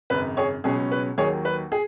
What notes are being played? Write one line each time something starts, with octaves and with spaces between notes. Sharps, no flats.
G#1 F#2 C#3 B4
G#4 C#5
C#2 B2 F#3 C#4 G#4
B4
D#2 D#3 F#3 G#4 C#5
B4
G#4